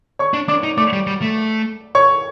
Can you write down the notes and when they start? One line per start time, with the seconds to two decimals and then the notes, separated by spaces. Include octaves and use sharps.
0.19 C#5 C#6
0.34 D4
0.48 D4 D5 D6
0.64 D#4
0.78 A3 D5 D6
0.93 G3
1.07 G3
1.22 A3
1.95 C#5 C#6